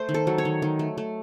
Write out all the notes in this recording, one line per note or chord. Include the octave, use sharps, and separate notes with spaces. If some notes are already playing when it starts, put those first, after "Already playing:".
Already playing: A3 C5
D#3
A4
F#3
C#5
D#3
D#3
A3
A3